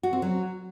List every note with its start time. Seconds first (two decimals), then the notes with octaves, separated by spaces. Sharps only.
0.03 F#4
0.13 C4
0.22 F#3